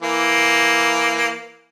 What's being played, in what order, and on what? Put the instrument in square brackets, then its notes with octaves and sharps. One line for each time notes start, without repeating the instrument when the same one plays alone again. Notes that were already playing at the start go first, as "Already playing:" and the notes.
[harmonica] E3 A#3